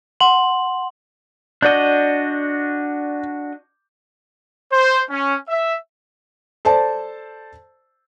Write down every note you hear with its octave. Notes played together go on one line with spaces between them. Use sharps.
F#5 C6 F#7
D4 F#4 D5 D#5 G6
C5
C#4
E5
A4 C5 D5 A5